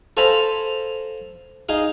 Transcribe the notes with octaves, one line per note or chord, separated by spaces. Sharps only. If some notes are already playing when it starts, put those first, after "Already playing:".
A4 C5 F5 G#5 A#5 B5
D#4 G#4 F5